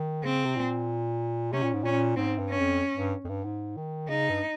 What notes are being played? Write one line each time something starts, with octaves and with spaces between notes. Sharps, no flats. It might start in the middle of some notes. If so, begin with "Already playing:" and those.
Already playing: D#3
C#3 C4
C3
A#2
C3 C#4
A#2
G#2
A#2 C#4
G#2 C4
G2
C#4
F2
G2
F2
G2
G#2
D#3
C#3 D#4
G2